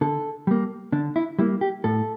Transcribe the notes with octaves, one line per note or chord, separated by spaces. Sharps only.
D3 A4
G3 A#3
D3 D4
E4
G3 A#3 E4
G4
A2 A4